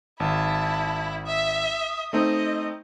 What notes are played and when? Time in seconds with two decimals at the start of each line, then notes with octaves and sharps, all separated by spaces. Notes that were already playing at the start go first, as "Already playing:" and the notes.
0.20 G#1 E4 A5
1.26 E5 D#6
2.13 A3 C4 D#4 D#5